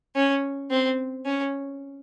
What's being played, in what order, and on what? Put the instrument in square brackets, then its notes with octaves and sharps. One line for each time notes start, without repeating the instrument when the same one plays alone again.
[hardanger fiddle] C#4
C4
C#4